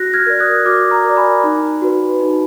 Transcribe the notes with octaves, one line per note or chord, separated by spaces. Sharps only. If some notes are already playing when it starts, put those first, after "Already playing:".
Already playing: F#4 F#6 A#6
F6 G#6
A#4 D5
D#6 F#6
F#4 D6 F6
A#5 D6
A#4 D5
G#5 B5
D#4
F#4 B4
D#4